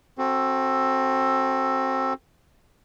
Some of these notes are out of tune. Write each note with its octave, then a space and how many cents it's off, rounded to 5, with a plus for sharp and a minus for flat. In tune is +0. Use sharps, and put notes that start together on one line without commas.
C4 +20 F#4 +0 A4 +0